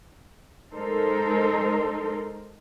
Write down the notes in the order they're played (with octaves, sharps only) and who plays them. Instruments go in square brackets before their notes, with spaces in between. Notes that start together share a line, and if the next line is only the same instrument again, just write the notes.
[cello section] G#3 D#4 A4 A#4 C5